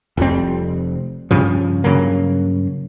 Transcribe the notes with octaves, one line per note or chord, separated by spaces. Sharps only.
F1 F2 G3 C4
G2 C#3 F3
G2 C#3 F#3 A#3